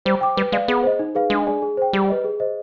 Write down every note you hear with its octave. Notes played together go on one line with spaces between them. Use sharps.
G3 C5
G5 D6
G3 B4
G#3 D5 F5
B3 G#4
C5 D#5
D#4
G#4 B4 F5
G#3 D4
G#4 D5 G#5
G#4
C5 G5
G3 G4
B4 D#5
G#4
C5 D#5